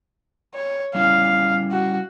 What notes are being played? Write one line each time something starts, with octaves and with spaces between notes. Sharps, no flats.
C#5
G3 C#4 E4 F5
F#4